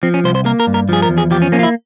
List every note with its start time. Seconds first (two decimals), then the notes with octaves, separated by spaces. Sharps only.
0.03 F3 C4
0.14 C#4
0.24 C2 C5
0.35 C5
0.45 A#3 A#4
0.60 A#4
0.67 G2
0.74 A#4
0.89 F3 G#4
1.02 A#4
1.10 E2
1.18 G#4
1.31 F3 G4
1.42 C#4
1.52 A#3 C#4
1.59 F4
1.63 E4